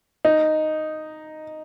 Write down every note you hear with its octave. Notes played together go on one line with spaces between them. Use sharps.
D#4